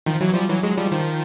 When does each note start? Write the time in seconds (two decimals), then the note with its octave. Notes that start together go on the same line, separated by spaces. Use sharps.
0.06 D#3 F3
0.20 E3 F#3
0.34 F3 G3
0.49 E3 F#3
0.63 F#3 G#3
0.77 F3 G3
0.92 D#3 F3